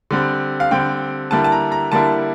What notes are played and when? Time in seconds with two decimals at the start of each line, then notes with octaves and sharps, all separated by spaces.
0.11 D3 G3 C4
0.60 F5
0.71 D3 G3 C4 G5
1.31 D3 G3 A#3 E4 A5
1.44 A5
1.52 A#5
1.72 A#5
1.92 D3 G3 A#3 E4 A5